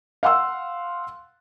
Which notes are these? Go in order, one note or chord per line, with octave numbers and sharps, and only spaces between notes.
F5 F#5 C6 E6